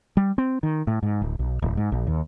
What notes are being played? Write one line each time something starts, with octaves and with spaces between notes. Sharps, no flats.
G3
C4
D#3
A2
G#2
D1
B1
D1
G#2
A#1
D#2